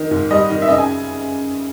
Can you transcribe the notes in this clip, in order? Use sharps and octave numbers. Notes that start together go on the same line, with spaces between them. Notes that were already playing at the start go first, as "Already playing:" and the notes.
Already playing: D#3
G#2
G3 D#5
D#3
E5
C#3 D#5
G#5